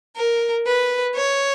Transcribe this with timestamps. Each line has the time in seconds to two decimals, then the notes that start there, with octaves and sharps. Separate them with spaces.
0.17 A#4
0.66 B4
1.16 C#5